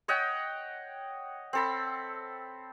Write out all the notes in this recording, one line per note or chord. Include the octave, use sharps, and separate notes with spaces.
C#5 D#5 F#5 G5
C4 A4 B5